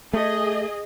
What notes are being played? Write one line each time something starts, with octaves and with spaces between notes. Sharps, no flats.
A3 G#4 D#5